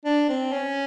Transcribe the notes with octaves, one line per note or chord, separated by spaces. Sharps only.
D4
C4
C#4